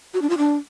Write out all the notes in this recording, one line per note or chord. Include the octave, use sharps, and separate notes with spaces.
F#4
D4
F4
D4